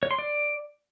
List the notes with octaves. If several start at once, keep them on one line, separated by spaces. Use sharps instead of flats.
C#5
C6
D5